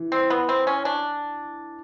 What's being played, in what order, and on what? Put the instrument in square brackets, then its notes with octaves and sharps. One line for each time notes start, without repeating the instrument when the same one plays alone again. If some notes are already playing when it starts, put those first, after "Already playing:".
Already playing: [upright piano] E3
[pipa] C4
B3
C4
C#4
D4